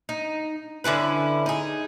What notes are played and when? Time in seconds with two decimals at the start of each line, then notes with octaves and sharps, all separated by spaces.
0.09 D#4
0.84 D3 C#4 E4 B4
1.46 D#4 G#4